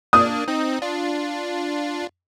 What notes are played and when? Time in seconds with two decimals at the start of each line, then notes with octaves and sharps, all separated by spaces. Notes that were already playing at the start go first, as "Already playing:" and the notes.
0.13 A#3 D4 D#6
0.48 C4 D#4
0.82 D4 F4